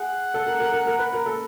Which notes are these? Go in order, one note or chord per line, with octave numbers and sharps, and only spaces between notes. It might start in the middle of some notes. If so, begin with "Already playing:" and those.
Already playing: G#4 F#5
A4
A#4
A#4
A#4
A#4
B4
A#4
A4